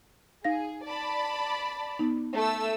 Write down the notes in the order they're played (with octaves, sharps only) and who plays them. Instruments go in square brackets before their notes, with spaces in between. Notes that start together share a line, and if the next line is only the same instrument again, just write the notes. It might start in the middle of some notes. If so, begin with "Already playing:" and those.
[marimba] D#4 F5 A#6 [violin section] G#4
[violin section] D5 A5 B5
[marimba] B3 D#4
[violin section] A3 E6